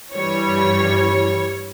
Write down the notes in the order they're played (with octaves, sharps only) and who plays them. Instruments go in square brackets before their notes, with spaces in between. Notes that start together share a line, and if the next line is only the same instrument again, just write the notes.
[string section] G2 E3 G3 C#5